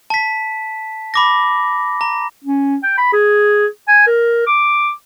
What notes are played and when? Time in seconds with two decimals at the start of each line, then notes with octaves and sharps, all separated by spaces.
0.10 A5 B6
1.14 B5 D6 A#6
2.01 A#5
2.44 C#4
2.83 G5
2.98 B5
3.13 G#4
3.88 G#5
4.07 A#4
4.47 D6